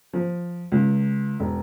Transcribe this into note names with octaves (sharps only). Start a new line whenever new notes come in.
F3
C#2
E1